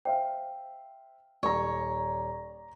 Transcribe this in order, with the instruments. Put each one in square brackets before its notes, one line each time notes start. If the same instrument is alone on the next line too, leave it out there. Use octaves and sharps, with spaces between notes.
[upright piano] C5 E5 F5 [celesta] G5
[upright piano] D#1 [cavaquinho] C#5 [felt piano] D5 A#5